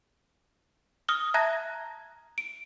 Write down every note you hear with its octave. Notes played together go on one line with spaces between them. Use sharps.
D#6 F6 A#6 G7
E5 A5 A#5 F#6 G#6 A#6
D7